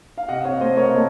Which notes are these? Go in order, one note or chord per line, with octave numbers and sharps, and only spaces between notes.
F5
C3 D#5 F#5
C#5 F5
A3 C5 D#5
A#4 C#5
A3